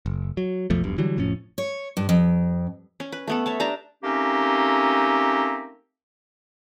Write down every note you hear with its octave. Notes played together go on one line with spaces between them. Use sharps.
F#1
F#3
B1 F2 F3 A3
E1 B1 G2
D3 E3 F#3 G3
F1 A2 F3 C#4
C#5
G2
F2
C#4
B4
A3 B3 A4
C#5 E5 A5
D4 G4 A5 A#5
A3 A#3 C4 C#4 D#4 G4